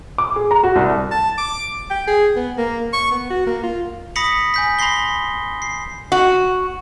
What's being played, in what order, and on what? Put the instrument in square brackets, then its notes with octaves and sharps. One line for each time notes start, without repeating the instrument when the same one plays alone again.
[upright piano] D6
G#4
A#5
F#4
C2
[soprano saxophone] A5
D6
G5
G#4
B3
A#3
C#6
B3
F#4
A#3
F4
[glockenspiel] B5 D#6 A#6 B6 C#7 F#7
G#5 G6 B6
B5 C6 A#6 C7 G7
C7
[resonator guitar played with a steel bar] F#4